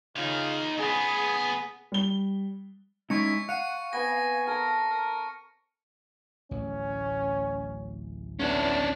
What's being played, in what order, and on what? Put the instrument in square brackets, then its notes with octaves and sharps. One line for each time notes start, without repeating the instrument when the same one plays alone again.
[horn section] C#3 F4 [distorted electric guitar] D#4 F5
[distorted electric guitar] C#3 B3 [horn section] G#4
[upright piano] G3 G7
[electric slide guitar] G#3 C#4 D#4 [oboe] E4 [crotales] C#6 C#7
[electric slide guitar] F5 [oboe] F#5 [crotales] C#7 D#7
[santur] B3 C4 B4 [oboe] G#5 [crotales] A#6
[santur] A4 A#5 [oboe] A#4
[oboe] A#4
[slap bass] D1 A1 [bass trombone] C#4
[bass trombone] E2 [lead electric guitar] C#4 D4